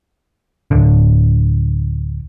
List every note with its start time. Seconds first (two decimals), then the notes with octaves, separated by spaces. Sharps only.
0.71 D1 D3